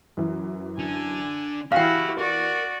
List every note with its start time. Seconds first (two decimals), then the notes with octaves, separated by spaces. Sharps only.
0.17 F#2 E3
0.79 D3 G#5
1.72 E3 E4 F#4 G4 F5 G5 G#5 F6
2.19 F#4 A#4 D5